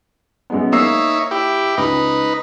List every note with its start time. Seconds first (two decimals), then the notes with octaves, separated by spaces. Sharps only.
0.50 F#2 G#3 B3
0.72 A#3 D#4 C#5 E5 E6 C7
1.31 E4 G4
1.77 C#2 D#4 B4